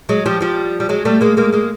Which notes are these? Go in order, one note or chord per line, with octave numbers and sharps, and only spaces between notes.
F#3 G#3
F3 G3
F3 G3
G3
F#3 G#3
G3 A3
G#3 A#3
G#3 A#3
G#3 A#3